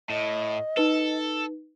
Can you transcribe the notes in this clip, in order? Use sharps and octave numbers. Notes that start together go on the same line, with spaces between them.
A2 D#5
D#4 A4 B4